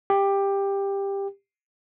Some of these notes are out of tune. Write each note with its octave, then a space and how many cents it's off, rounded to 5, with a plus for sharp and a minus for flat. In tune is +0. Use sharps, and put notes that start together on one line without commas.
G4 +15